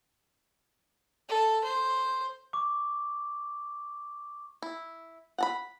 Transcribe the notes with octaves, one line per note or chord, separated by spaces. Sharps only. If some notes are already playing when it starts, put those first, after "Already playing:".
A4
C5
C#6 D6
E4
F#5 A5 B5